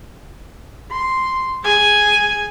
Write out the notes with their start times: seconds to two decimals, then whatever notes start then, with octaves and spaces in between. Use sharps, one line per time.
0.91 C6
1.63 G#4 G#5